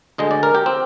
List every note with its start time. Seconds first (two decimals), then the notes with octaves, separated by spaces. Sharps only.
0.18 D2 D3 G#3 D#5
0.31 D5
0.43 A#4
0.55 G4
0.66 C4